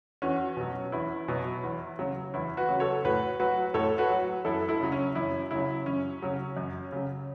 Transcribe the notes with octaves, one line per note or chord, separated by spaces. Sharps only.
E2 C#4 F#4
B2 F#3
E2 E4
B2 F#3
E2
C#3 F#3
E2 E4
F#4 B4
C#3 F#3
A4 C#5
A2 F#4 B4
F#3 F#4 B4
A2 A4 C#5
F#4 B4
F#3
F#2 E4 A4
E4
C#3 F#3
C#4
F#2 E4
C#3 F#3 E4
F#2 C#4
C#3 F#3
F#2
C#3 F#3